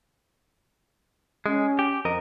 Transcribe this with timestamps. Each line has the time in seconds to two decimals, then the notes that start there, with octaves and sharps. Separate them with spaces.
1.46 G#3 C#4
1.79 G4
2.05 F2 A#4 D#5